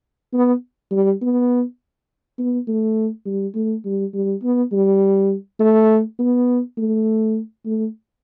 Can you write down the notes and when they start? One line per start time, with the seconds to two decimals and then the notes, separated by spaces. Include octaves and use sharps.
0.33 B3
0.91 G3
1.21 B3
2.38 B3
2.68 A3
3.26 G3
3.55 A3
3.85 G3
4.14 G3
4.43 B3
4.72 G3
5.60 A3
6.19 B3
6.78 A3
7.65 A3